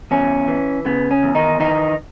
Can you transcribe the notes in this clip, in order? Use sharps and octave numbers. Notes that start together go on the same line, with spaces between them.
E2 C#4
E3
C#3 B3
C#4
E2
D#3 D#4
D#3 E3 D#4